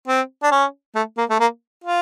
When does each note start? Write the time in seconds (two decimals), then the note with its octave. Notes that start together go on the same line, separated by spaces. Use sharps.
0.08 C4
0.43 D4
0.51 C#4
0.95 A3
1.17 A#3
1.30 A3
1.40 A#3
1.84 F4